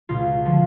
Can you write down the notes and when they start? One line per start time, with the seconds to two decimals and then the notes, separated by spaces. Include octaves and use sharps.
0.09 C#2 B2 F4
0.45 D3 F3